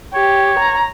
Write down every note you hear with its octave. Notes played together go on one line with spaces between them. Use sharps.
G4 C#5
A#5